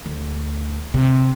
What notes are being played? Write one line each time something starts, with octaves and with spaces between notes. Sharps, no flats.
D2
C3